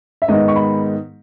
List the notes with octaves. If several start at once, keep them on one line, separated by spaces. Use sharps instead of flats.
E5
G#2 D#3 G#3 B3 D#4 D#5
C#6
B5